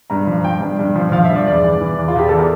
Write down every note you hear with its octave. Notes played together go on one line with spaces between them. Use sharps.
G2 A#5
F3
F3 G5
G2
G2
F3
F3 F5
E5
G2
D5
E2 D5
E3
E3
E2
F4
E2 G4
E3 A4
A#4